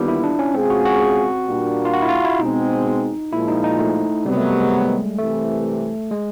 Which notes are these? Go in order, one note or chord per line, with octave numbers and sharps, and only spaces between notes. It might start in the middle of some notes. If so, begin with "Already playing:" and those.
Already playing: D#2 D3 G3 B3 F4
E4
D4
C#4
B2 G#3 C4 C#4 F4 G#4
F#4
F#4
A#2 G3 A#3 D4
F4
F#4
E4
F4
E4
B2 G#3 C4 D#4
A#2 F3 G#3 E4
D#4
D#4
A3
C3 D#3 F#3 G3 B3
A3
G#3
C2 C3 E3 A3
G#3